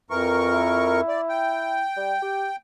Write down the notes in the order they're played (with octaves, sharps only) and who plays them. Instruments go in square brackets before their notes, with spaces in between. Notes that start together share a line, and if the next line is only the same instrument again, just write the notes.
[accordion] F2 A#4 C#6 [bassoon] E3
[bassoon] E4
[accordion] D5
G5
[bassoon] G3
G4